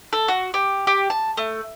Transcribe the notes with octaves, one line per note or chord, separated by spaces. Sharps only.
A4
F#4
G4
G4
A5
A3